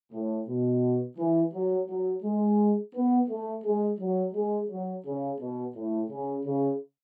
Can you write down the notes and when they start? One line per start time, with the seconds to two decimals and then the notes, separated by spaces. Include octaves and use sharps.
0.12 A2
0.48 B2
1.17 E3
1.53 F#3
1.88 F#3
2.23 G#3
2.94 B3
3.29 A3
3.64 G#3
3.99 F#3
4.34 G#3
4.69 F#3
5.05 C#3
5.40 B2
5.75 A2
6.10 C#3
6.45 C#3